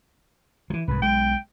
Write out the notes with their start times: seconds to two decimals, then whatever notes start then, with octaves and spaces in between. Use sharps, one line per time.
0.70 E3 F3
0.88 C2 G#2 B4
1.02 B1 G#3 G5